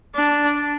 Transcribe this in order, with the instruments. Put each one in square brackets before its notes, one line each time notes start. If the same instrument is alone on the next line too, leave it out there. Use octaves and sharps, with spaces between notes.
[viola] D4